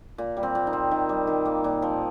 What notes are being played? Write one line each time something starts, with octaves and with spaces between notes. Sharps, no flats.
A#2
G3
C4
A#2
D#4
C4
D#3
G3
D#3
A#3
A#2
F3